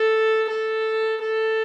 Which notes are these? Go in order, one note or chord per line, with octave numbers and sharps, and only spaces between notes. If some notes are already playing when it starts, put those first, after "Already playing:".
Already playing: A4
A4
A4